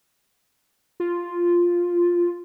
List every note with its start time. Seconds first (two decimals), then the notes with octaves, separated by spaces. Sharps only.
1.00 F4